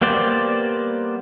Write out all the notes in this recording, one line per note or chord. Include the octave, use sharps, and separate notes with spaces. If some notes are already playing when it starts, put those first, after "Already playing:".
G3 A#3 B3 C5 D5